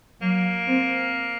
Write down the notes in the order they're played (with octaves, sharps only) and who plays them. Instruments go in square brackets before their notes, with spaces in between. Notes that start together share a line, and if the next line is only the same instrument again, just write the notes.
[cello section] F#3 [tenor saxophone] A#3
[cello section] C4